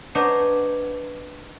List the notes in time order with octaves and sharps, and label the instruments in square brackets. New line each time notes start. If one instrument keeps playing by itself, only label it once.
[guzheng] B3 D4 D#4 C5 C#5